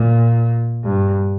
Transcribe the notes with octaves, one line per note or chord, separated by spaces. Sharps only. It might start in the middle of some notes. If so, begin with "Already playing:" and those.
Already playing: A#2
G2